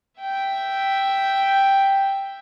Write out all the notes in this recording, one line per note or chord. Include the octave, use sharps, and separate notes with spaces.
E5 G5